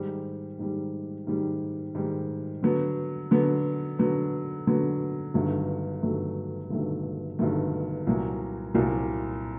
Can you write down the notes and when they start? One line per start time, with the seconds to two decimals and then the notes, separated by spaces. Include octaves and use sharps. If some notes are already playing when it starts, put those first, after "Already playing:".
Already playing: G#2 D#3 G3
0.59 G#2 D#3 G3
1.27 G#2 D#3 G3
1.95 G#2 D#3 G3
2.63 D3 F#3 B3
3.31 D3 F#3 B3
3.99 D3 F#3 B3
4.67 D3 F#3 B3
5.34 G1 G2 D#3 F#3 A3
6.03 G1 G2 D#3 F#3 A3
6.70 G1 G2 D#3 F#3 A3
7.39 G1 G2 D#3 F#3 A3
8.07 C2 A#2 F#3
8.74 C2 A#2 F#3